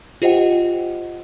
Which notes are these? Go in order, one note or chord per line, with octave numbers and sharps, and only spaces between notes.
F4 G4 C5 D#5 F#5 G5